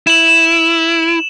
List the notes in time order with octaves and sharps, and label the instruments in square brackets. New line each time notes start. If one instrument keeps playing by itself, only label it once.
[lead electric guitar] E4 [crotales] E7 F#7